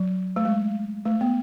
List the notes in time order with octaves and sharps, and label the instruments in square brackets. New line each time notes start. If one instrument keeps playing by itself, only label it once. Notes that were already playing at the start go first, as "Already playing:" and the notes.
Already playing: [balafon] F#3
A3
G#3
A3
B3